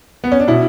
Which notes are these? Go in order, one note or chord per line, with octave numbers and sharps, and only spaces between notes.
B3
C#4
D4
B2 E4